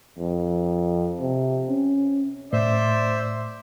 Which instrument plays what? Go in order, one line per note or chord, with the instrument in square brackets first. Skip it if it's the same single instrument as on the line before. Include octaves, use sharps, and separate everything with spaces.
[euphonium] F2
C3
C#4
[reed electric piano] A2 [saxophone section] C5 [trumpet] D5 [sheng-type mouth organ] E5